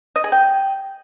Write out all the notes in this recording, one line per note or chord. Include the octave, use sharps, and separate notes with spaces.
D#5
G#4
G5